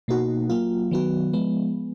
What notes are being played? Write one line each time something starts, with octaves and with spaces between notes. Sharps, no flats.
B2 A#3 D#4 F#4
F#3 A#3 F4
D#3 F#3 B3 F#4
F3 G#3 B3